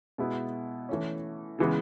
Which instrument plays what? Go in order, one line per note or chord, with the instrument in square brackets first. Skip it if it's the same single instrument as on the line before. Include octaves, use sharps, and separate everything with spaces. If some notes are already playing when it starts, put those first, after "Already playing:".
[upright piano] B2 G#3 B3 E4
E3 A3 C#4
C#3 E3 G#3 B3